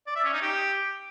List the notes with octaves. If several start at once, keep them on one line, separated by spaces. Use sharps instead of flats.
D5
E5
C#4
D#4
G4